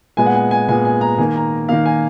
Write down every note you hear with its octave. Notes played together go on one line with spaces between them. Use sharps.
A#2 G#3 B3 G#5
F#5
G#5
G#5
A#2 G#3 B3 G#5
G#5
A#5
D#3 A#3 G#5
A#5
D#3 A#3 F5
G#5